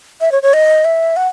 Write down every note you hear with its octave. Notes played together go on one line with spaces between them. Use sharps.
E5
C#5
C#5
D#5
E5
F#5